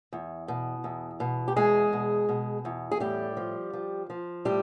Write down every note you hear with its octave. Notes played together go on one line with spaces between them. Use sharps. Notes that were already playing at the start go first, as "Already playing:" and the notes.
E2
B2
E2
B2
G4
E2 G#3 G#4
B2
B2
E2
G#4
A2 G3 G4
F3
F3
F3
A2 G3 G4